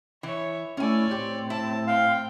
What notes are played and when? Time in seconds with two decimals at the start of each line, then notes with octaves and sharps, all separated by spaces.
0.23 E3 C#5 E5
0.77 A3 C#4 E4 C#5 D5 G#5
1.11 A2 C4 G4
1.50 E4 A5
1.87 F5 G5